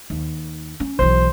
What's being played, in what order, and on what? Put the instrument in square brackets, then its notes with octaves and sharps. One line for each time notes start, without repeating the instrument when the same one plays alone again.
[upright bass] D#2
C#4
[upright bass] B1 E3 [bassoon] C5